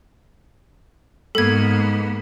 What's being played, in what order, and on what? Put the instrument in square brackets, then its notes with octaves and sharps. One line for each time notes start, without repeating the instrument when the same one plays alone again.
[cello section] G#2 [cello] A#3 B3 [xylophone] A4 G#6